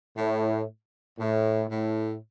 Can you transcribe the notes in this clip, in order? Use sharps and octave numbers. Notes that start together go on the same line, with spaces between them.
A2
A2
A2